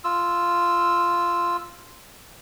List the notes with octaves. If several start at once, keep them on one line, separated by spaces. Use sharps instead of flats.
F4 E6